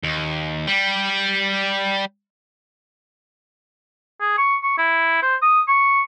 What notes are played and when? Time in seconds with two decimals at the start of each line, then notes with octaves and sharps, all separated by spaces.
0.03 D#2
0.67 G3
4.20 G#4
4.38 C#6
4.63 C#6
4.78 E4
5.22 C5
5.42 D#6
5.68 C#6